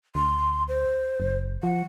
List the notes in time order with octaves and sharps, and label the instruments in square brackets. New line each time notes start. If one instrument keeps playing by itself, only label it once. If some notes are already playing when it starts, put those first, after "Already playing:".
[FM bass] D2 [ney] C6
[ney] C5
[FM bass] F#1
[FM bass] F3 [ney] F#5